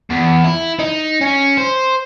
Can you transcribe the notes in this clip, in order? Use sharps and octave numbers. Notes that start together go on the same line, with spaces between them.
E2
E4
D#4
C#4
C5